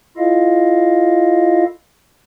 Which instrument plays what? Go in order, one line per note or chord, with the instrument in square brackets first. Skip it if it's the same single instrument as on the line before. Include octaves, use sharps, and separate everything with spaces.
[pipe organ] E4 F4 A4 D#5 F5